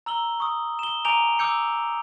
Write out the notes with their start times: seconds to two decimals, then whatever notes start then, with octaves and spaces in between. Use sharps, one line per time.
0.06 A#5 E6 F#7 G7
0.40 C#6 D#6
0.79 E7 G7
1.05 G#5 A#5 D6 G6 D7 F7
1.39 D6 E6 G6 C#7